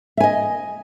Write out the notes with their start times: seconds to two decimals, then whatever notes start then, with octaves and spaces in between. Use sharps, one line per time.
0.17 E5
0.20 G#5
0.23 D#5